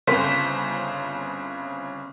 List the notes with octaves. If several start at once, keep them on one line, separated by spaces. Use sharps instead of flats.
G1 C#3 C4 C5 B6